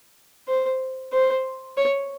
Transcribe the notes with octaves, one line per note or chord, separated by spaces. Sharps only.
C5
C5
C#5